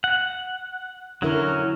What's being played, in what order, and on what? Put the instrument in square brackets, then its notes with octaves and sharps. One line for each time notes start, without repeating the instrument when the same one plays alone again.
[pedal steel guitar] F#5
[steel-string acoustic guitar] D3 E4 A#4 [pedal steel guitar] F#3 C#4